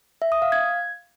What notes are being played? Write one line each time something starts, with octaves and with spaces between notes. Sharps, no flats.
E5
D#6
F5
G#6